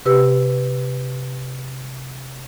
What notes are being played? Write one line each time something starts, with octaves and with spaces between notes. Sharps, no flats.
C3 G4 B4 E6